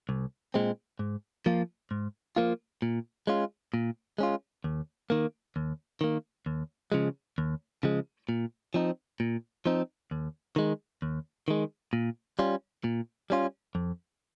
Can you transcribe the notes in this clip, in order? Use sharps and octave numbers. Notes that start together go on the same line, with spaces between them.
C2
A#2 G#3 C4
G#2
F3 A#3 F4
G#2
F3 A#3 F4
A#2
G#3 C#4 F4
A#2
G#3 C#4 F4
D#2
D#3 A#3
D#2
D#3 A#3
D#2
C#3 F3 G#3
D#2
C#3 F3 G#3
A#2
F3 C4 D#4
A#2
F3 C4 D#4
D#2
D#3 G#3
D#2
D#3 G#3
A#2
G3 C#4 F4
A#2
G3 C#4 F4
F2